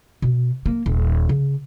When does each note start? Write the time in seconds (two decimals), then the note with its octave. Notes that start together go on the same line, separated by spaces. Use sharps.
0.22 B2
0.66 A#3
0.86 D#1
1.29 C#3